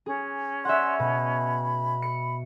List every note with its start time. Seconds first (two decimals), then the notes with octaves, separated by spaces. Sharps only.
0.06 C#4 G#4
0.65 D5 E5 F#5 G#5 C6
0.99 B2 B5
2.02 C#7